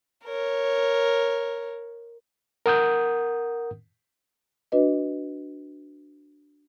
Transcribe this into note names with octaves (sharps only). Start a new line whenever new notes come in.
A#4 C#5
A#4 F#5 D#6 G6
D4 F#4 B4 D#5